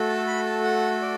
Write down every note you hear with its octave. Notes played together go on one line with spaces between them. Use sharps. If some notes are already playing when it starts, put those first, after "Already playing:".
Already playing: A3 F#4 A4
A5
B5
A5
F#5
D5